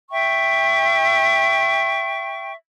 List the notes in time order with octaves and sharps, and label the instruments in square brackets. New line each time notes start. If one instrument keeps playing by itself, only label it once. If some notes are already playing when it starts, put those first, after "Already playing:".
[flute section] E5 G5 C#6